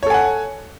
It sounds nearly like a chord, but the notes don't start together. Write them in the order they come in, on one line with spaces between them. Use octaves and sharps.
C#5 A4 G#5 F#5